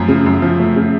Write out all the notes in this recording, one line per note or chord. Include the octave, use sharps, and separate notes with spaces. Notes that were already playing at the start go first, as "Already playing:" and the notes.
Already playing: F#2 F3 A3
C#3
F#2
F3
A3
C#3